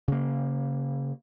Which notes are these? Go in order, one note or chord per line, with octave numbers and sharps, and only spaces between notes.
C#3 A#3